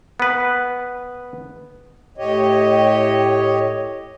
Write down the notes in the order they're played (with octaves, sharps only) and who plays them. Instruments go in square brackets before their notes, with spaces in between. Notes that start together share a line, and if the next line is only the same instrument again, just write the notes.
[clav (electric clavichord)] B3 B4
[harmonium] A2 G4 C#5 D#5